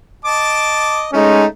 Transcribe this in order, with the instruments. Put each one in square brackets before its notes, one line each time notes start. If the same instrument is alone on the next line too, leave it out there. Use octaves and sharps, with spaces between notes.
[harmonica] D#5 A5 D6
[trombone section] G#3 C#4 D#4 [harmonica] A3